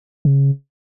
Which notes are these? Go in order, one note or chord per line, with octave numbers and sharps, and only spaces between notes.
C#3